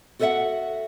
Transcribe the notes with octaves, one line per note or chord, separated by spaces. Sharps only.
F#4 A4 C5 D#5 E5 F#5